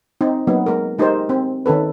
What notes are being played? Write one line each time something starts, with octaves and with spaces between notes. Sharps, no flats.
C4 D#4
F#3 A#3 B3 D#4 G#4
G#3 A#4
G#3 D#4 G4 A#4 C5
C4
D#3 C#4 A4 B4